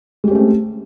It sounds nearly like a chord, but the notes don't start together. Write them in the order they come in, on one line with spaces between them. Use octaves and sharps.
G#3 G4 C#4 A3 C4